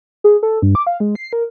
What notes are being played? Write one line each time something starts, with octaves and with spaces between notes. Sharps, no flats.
G#4
A4
G2
D6
F5
G#3
C7
A#4